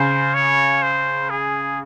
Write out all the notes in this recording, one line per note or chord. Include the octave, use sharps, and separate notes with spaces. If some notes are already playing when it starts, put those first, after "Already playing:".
Already playing: C#3 C5
C#5
C5
G#4